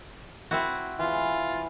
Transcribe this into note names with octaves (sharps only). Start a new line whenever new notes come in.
C4 E4 F#4
E3 F4